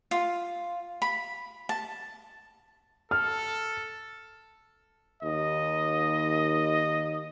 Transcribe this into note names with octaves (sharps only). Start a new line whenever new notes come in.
F4
B5
A5
A4 F6
D#2 D#5